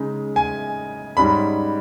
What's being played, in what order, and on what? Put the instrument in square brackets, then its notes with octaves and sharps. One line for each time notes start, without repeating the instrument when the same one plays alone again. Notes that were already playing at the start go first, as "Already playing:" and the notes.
Already playing: [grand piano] C#3 G#3 D#4
G#5
G#2 G3 C#4 B5